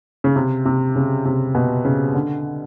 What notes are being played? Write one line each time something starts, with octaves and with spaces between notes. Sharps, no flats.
C#3
C3
C3
C#3
C3
B2
C#3
D3